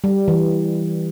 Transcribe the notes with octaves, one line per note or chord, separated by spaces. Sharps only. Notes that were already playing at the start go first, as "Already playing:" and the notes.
G3
E3